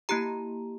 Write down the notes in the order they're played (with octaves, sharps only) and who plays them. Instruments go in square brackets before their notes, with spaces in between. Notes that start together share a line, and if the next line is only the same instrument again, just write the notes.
[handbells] A#3 E4 G4 A#5